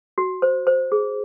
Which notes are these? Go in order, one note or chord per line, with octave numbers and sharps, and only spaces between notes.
F#4
C5
C5
G#4